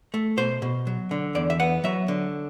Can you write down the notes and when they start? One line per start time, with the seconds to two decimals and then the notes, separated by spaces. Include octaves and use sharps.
0.14 A3
0.37 B2 C5
0.62 B2
0.87 F#3
1.11 D3
1.35 E2 D5
1.50 E5
1.60 B3 F#5
1.84 F#3 E5
2.08 D3